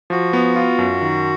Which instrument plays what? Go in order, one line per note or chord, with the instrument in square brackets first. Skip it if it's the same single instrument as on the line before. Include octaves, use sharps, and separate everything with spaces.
[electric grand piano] F3 [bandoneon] F#4
[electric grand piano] B3
F4
F#2
D#3